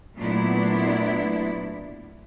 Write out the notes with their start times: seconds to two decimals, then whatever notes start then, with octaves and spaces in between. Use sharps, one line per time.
0.16 A#2 F#3 A3 B3 D4 E4